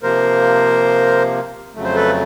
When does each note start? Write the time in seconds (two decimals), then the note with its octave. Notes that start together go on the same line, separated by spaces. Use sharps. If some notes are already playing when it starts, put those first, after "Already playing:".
0.03 C3 F3 A#3 A#4 C5
1.75 F2 C#3 F#3 A3
1.84 C5
1.96 A4 B4